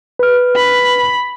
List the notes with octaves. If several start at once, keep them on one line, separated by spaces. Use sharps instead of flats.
B4 F6
B5